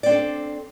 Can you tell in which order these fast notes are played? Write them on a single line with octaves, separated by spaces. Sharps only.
D5 C4 D4 A4